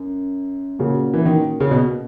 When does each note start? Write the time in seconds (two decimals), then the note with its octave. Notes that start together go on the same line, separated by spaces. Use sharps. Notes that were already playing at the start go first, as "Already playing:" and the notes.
Already playing: F#2
0.79 A#2 C#3 A#3 C#4 F#4
1.14 E3
1.26 D#3
1.60 C#3
1.71 B2